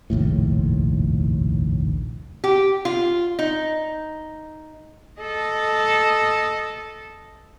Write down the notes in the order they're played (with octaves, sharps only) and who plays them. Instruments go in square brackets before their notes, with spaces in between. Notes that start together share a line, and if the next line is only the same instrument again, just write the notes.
[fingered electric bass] F1 A#1 D#2 A2
[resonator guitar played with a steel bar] G4
F4
D#4
[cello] A4 D#5